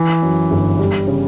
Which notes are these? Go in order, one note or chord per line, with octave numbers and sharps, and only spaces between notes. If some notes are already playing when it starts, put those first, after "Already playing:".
Already playing: E3
F#2
G1
G3
C#3